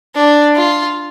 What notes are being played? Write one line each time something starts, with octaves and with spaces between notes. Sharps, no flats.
D4
F4